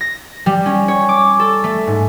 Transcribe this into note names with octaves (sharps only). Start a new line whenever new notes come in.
A#6
G3
C#4
C#5
D6
A4
A3
G#2